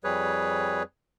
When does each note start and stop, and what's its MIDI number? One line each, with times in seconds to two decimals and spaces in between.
0.04 0.83 41
0.04 0.83 55
0.04 0.83 68
0.04 0.83 71
0.04 0.83 73